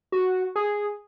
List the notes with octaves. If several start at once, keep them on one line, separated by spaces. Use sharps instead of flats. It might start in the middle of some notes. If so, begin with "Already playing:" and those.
F#4
G#4